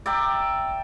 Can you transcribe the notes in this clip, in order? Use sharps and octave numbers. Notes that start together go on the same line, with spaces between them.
D5 E5 G5 A#5